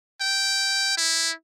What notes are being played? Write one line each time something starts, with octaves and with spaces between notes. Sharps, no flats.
G5
E4